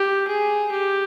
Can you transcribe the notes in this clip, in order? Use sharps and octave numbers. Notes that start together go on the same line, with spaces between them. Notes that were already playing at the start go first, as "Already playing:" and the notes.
Already playing: G4
G#4
G4